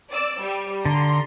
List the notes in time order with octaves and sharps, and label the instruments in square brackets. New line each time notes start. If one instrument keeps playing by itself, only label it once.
[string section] D5 E6
G3
[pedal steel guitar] D3 [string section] A#5 C6